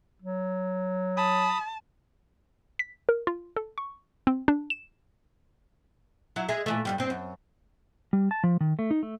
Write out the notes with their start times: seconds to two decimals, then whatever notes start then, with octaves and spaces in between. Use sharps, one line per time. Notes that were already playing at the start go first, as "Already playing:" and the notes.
0.22 F#3
1.17 A5 B5 D#6
2.79 B6
3.09 A#4
3.27 F4
3.57 A4
3.78 C#6
4.27 C4
4.48 D4
4.70 E7
6.36 F#3 E4
6.49 G#3 G#4 E5
6.66 A#2 E3 A3
6.85 G2 B2 G3
6.98 G2 C4
7.10 F#2
8.13 G3
8.31 A5
8.44 F3
8.61 D#3
8.79 A3
8.91 D#4
9.03 A3